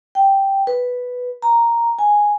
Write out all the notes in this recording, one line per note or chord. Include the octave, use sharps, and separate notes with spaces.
G5
B4
A#5
G#5